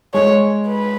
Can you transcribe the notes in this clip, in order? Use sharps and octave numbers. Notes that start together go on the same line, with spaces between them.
G#3 C#5
B4